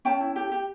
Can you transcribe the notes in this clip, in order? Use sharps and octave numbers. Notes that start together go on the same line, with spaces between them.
C#4 G5 A5
E4
G4
G4